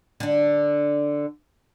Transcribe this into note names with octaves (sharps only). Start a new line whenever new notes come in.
D3 D4